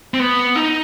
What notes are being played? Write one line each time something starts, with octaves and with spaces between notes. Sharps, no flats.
C4
B3
D#4